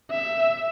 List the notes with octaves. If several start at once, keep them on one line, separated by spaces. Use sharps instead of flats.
E5